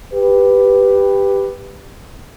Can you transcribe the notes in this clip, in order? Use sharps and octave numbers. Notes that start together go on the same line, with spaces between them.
G4 B4